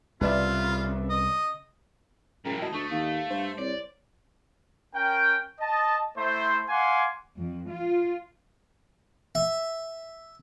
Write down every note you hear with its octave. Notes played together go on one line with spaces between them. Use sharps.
C2 C#3 F4 B4 D5 E5
D#5
F#2 A2 C#3 A#4 G5
F#3 D#5 A5
D2 A3 C#6
D#2 F5
G2 C5
C2 C#5 D5
C#4 A#4 G5
D#5 A5
A3 E4 C5
F5 F#5 G#5 C6 D6
F2
F4
E5